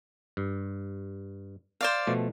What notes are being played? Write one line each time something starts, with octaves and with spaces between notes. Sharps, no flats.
G2
C5 D5 F5
B2 F3 A3